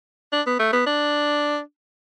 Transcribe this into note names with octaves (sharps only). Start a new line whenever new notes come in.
D4
B3
A3
B3
D4